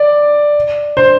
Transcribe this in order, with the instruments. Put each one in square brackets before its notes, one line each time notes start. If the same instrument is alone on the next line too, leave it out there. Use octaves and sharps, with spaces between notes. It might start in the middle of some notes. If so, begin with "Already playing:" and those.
Already playing: [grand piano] D5
C5